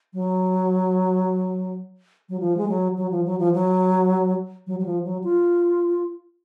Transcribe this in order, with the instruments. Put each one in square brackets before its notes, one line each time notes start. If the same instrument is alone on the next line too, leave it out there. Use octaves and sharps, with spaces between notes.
[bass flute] F#3
F#3
F3
G#3
F#3
F#3
F3
F#3
F3
F#3
F#3
F#3
F3
F#3
F4